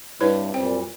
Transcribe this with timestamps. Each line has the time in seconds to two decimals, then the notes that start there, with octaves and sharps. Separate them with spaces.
0.21 G2 C3 E4 B4 C#5
0.54 F#2 A#2 G3 C4 G5